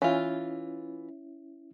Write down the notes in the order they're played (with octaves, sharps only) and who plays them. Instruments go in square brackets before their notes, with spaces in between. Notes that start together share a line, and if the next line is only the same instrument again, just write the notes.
[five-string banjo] E3 F4 [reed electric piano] C#4 E4